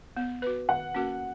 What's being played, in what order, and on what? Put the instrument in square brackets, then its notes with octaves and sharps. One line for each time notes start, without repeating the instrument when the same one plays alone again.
[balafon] B3
F#4 B4
[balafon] D#3 [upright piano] F#5
[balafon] A#3 C#4 F#4 A#4